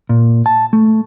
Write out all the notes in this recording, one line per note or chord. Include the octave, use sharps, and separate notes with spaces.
A#2
A5
A3